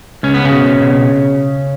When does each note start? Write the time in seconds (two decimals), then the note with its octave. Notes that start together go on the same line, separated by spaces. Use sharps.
0.23 C#2 C#4
0.34 B3
0.45 C#3 C#4
0.52 B2
0.80 B2